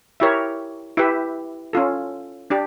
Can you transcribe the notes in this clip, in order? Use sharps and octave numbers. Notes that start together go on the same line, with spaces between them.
E4 G4 A#4 C#5 E5
E4 G4 B4 E5
C#4 F4 A4
D4 G4 D5